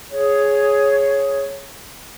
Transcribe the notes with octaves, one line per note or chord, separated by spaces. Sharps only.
G#4 C#5